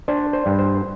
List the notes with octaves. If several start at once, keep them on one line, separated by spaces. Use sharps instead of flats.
D4 C5
C5
G2
C5